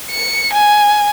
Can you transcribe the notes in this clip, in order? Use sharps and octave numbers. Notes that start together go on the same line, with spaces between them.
C#7
G#5